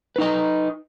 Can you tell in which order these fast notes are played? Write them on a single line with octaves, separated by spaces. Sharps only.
B4 D#4 D#5